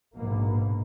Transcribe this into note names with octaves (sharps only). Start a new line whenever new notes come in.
A#1 G#2 B2 A#3